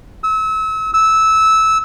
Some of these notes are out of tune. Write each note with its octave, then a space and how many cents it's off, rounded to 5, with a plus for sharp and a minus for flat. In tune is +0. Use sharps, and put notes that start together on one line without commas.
E6 -35
E6 -15